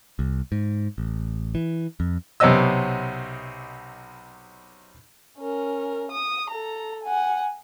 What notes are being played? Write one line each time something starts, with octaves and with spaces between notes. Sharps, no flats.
C2
G#2
A1
E3
F2
B1 C3 B3 C#4 D#5 E6
C#4 A#4
D#6
A4 A#5
F#5 G#5